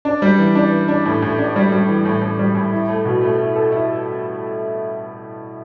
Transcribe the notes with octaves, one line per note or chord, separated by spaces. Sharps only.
D4
G3
E3
D4
E3
D4
A2
A2
D4
G3
G3
E3
A2
A2
G3
A2
E4
A3
B2
A3
E4
A4
E4